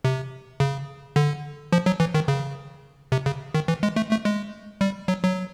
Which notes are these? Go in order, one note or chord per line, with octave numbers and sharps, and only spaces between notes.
C3
C#3
D3
F3
F#3
E3
D#3
C#3
C3
C#3
D#3
E3
G#3
A3
A3
G#3
G3
F#3
F#3